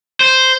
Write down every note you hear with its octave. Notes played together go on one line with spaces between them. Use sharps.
C5